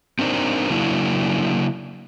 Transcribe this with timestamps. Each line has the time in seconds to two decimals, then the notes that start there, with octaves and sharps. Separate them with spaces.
0.19 C4 D4 D#4 A#4 C5 D5
0.70 C#3 F#3 A#3 D4 E4